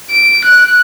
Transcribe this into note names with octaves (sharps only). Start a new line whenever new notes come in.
D7
F#6